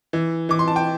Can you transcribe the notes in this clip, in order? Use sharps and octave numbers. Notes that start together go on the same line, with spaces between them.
E3
E3 D6
C6
A5
G5